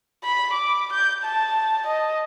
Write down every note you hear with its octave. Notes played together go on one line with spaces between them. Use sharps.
B5
D6
G6
A5
D#5